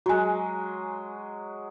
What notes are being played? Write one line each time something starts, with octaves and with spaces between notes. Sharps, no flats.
F#3 G#3 F#4 G#5